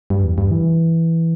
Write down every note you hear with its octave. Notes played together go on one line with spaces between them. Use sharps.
G2
E2
G2
E3